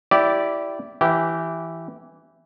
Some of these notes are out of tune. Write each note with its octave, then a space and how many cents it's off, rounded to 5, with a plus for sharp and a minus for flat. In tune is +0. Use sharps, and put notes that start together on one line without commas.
E4 +0 G4 -10 D5 -10
E3 +0 G4 -15